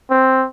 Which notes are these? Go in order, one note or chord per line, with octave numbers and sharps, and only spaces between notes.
C4